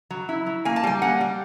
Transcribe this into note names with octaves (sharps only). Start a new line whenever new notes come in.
F#3
E4
F#3
A#3 G#5
A5
G3 G#5
A#3 F#5
G3